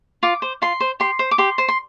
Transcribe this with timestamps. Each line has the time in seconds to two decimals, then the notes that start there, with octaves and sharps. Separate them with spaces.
0.23 F4 D6
0.42 C5
0.62 F4 C6
0.80 C5
1.00 G4 C6
1.19 C5
1.31 D6
1.38 G4 C6
1.58 C5
1.68 C6